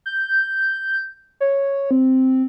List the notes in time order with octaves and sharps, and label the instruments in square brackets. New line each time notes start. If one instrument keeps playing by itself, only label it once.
[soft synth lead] G6
C#5
C4